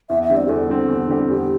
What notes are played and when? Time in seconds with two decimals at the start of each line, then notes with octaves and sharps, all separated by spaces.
0.09 E2 E5
0.23 E5
0.29 D3 G3 C4 G4
0.37 D5
0.45 G4
0.49 E2 A4
0.69 D3 G3 C4 G4
0.88 E2
1.09 D3 G3 C4 G4
1.28 E2 G4